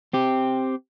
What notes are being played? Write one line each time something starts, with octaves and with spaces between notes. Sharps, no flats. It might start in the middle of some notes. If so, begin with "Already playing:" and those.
C4 G4